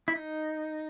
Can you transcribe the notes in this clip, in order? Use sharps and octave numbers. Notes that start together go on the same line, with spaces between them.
E4
D#4